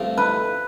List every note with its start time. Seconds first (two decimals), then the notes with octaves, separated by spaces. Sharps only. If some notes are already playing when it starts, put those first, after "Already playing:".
Already playing: G2 D3 F3 A3 C4
0.17 B4